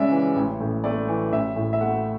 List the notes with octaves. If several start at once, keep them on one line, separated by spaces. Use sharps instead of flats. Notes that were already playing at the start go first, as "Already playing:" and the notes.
Already playing: C#2 C#3 G#3 C#5 D5 E5
E3
A1
A2
A3 D5
E3
A1 E5
A2
E5
A3 F#5